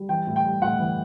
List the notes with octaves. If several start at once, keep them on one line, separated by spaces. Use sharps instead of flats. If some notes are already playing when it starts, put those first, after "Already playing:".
Already playing: G3
E3 G5
A2
G5
G3
A2 F#5
E3